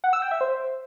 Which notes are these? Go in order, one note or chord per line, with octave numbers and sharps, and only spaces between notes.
F#5
E6
G5
E5
C5